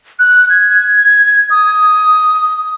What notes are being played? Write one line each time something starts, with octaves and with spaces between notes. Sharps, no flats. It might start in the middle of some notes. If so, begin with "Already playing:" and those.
F#6
G#6
D#6